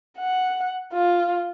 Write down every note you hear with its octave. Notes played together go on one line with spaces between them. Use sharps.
F#5
F4